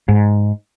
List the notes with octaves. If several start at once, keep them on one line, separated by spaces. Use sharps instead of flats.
G#2